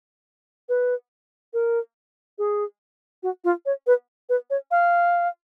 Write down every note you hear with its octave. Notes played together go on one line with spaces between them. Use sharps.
B4
A#4
G#4
F#4
F4
C#5
B4
B4
C#5
F5